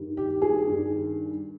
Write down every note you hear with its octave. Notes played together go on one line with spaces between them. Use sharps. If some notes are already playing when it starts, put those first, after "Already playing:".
Already playing: G2 D#3 G3
G4
G#4
G2 D#3 G3